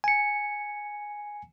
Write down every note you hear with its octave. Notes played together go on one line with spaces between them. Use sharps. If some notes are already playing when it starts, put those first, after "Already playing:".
G#5 C#7